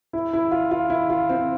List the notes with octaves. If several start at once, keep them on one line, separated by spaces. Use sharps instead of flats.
E4
E4
F4
F4
E4
F4
C4